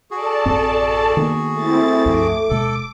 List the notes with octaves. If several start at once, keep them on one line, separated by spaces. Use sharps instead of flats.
F#4 G#4 A4 D5 A5
A1 F#2 C4
D#3 A#3 B3
A3 C4 E4 A6
C#2 G2 F3 D6
D1 B2 G#3 A4